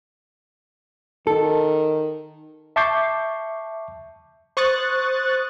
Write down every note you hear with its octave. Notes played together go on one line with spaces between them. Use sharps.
D#3 A4
E5 A5 C#6 D6 G6 C7
C5 C#6 D#6 F#6 A6